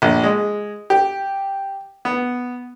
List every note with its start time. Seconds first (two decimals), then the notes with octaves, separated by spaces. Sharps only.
0.02 A#1
0.23 G#3
0.90 G4
2.05 B3